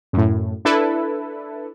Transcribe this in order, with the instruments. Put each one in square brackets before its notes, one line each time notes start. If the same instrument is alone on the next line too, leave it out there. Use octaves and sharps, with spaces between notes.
[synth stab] F#2 A2
D4 E4 A4 B4